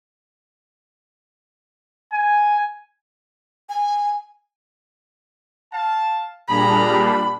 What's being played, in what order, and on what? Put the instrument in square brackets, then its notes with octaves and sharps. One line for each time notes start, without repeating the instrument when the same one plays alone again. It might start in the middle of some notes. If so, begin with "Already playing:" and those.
[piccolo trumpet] G#5
[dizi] G#5
[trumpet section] F5 A5
[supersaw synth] A#2 G3 D4 [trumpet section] G#4 A#5 [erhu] B5